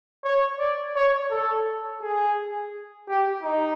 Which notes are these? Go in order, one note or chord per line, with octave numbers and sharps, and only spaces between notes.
C#5
D5
C#5
A4
G#4
G4
D#4